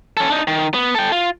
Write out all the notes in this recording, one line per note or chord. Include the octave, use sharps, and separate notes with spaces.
C#4 A4
D4 D#4
D#3
B3
A4 G5
F4